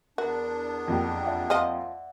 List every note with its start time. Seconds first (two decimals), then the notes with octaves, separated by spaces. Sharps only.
0.18 E2 B3 D4 F#4 A#4
0.88 F2 A#3 G4
1.26 D5 E5 F#5
1.50 F3 F4 D#5